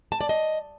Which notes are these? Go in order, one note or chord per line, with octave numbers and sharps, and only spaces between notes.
A5
D5
D#5